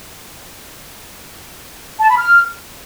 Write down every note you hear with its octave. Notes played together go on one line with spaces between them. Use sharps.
A5
B5
F6